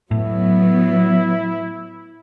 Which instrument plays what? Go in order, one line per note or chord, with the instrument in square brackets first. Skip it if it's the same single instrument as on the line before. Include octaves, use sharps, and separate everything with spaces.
[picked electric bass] A2 [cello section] F#3 B3 [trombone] E4